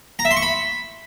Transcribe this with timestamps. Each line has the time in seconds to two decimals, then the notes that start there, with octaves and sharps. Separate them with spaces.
0.19 A#5
0.25 E5
0.31 C6
0.37 C#6
0.42 B5